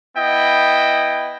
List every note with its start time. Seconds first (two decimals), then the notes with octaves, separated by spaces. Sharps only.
0.17 B3 E4 D#5 G5